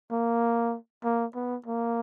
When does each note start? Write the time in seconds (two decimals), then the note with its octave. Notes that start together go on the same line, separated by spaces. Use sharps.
0.12 A#3
1.04 A#3
1.35 B3
1.66 A#3